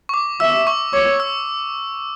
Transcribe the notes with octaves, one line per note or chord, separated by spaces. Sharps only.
C#6
D6
E5 E6
C#6
C#5 D6
E6